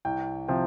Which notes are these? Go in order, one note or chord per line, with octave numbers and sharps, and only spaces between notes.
C2 G5
C3 F3 G5